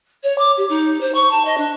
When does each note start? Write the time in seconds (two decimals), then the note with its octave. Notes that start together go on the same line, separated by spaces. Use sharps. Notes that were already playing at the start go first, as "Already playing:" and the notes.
0.23 C#5
0.38 D6
0.57 G4
0.69 D#4
1.01 C5
1.15 C#6
1.31 A5
1.45 D#5
1.58 D4